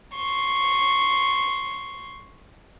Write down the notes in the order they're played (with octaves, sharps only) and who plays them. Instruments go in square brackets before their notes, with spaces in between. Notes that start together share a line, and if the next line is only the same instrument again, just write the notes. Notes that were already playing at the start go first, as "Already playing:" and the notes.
[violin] C6 C#6